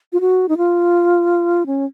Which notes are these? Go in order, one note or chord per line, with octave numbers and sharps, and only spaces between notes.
F4
F#4
D#4
F4
C#4